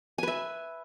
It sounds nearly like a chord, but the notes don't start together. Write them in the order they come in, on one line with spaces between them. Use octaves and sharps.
G#5 B4 E5